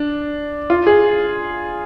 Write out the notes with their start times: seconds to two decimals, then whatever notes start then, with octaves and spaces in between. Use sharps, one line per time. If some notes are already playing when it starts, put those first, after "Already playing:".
Already playing: D4
0.70 F4
0.87 G#4